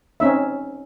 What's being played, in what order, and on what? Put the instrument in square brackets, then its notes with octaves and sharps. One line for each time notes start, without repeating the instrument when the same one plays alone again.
[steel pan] C4 C#4 D#4 E5